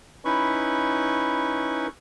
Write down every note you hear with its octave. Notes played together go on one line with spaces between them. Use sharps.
C#4 D#4 E4 B4 B5 C#6